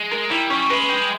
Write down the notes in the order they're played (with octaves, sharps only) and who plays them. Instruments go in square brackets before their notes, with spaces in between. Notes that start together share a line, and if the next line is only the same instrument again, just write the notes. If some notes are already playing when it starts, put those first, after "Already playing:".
Already playing: [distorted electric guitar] G#3
[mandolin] A#4
[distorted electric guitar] G3 [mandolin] E4
[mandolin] C#4
[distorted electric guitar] G#3 [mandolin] B4
[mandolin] G4